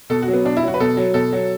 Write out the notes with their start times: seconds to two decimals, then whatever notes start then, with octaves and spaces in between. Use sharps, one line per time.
0.10 B2 A4
0.22 F#4
0.28 F#3
0.33 B3
0.45 B2 D4
0.57 E4
0.63 F#3 F#4
0.74 B4
0.80 B2 A4
0.97 F#3
1.14 B2 A4
1.33 F#3